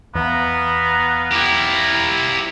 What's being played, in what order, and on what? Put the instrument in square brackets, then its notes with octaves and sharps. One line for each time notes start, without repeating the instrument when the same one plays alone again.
[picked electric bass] E2 [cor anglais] B3 [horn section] F5 A#5
[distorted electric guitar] E4 G4